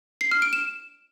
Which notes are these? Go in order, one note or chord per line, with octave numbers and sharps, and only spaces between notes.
C7
F6
D7
E7